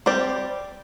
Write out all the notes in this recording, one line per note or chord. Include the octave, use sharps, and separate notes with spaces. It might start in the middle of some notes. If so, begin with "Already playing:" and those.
G3 C4 G4 D5